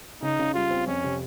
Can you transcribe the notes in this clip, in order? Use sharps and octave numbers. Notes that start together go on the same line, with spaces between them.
C#3 D#4
C#3
G3 F4
C4
F2 C#4
C3